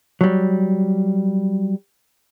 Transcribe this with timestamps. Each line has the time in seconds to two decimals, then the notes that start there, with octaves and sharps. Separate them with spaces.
0.21 F#3 G3